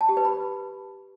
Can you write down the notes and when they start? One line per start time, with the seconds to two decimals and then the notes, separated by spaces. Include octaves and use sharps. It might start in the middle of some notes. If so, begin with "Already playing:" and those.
0.01 A5
0.09 G4
0.17 B4
0.25 B5